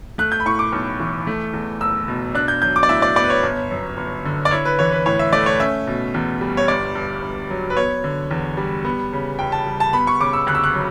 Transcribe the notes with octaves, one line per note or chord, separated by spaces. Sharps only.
A3 F#6
G6
B5
A2 C#6
D6
B1
E3
A3
E2
F#1 E6
B2
D4 F#6
G6
F#3 G6
D6
D5
A2 E5
D5
B3 D5
B4
C#5
G1
F#2
G1
D3
D5
E4 C#5
B4
E3 C#5
B4
A2 C#5
E5
A3 D5
C#5
C#4 E5
B2
E2
G3
C#5
G1 D5
G2
G1
F#3
B4
B3 C#5
D3
E2
G3
B3
C#3
C#2 G5
A5
G3
A5
B3 B5
C#6
C#3 D6
E6
D2 F#6
E6
F#6
F#3